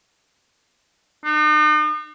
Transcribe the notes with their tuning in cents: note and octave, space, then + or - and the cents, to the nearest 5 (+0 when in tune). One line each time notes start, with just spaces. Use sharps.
D#4 -45